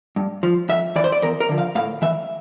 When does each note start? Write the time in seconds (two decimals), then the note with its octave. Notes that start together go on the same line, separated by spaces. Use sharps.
0.16 G2
0.43 F3
0.69 F2 E5
0.96 E3 D5
1.04 C5
1.12 D5
1.22 E2 A#4
1.40 A#4
1.49 D3 F3
1.58 F5
1.75 A2 F5
2.02 E3 E5